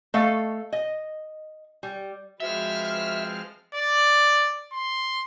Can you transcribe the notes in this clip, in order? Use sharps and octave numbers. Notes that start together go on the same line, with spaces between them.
A3 A4 D#5 F5
D#5
G3
F3 G#3 C4 F#4 B4 E5 F6
D5
C6